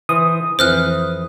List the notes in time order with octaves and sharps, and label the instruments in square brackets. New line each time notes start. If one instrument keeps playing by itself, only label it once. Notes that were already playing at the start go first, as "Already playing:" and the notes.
[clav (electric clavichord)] E3 C5 [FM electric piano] D#6
[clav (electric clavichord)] F2 E3 [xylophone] C5 F6 F#6